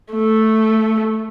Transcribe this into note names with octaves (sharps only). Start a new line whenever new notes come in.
A3